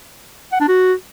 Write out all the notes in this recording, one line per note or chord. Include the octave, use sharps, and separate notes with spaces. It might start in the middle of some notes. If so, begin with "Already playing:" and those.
F#5
D4
F#4